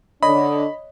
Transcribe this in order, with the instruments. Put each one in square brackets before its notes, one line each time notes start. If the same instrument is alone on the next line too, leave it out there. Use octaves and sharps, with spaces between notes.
[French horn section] D3 D4 [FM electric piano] C#5 D#5 [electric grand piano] B5